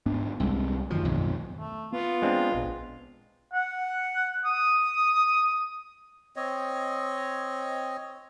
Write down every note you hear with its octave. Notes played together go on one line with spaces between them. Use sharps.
G#2 B3 D4
C2 C3 G#3
F#2 D#3 F3 F#3
B1 F2 G#2
A3
B3 F4
G#3 C4 D4
A#1
F#5
D#6
C4 C#5 D#5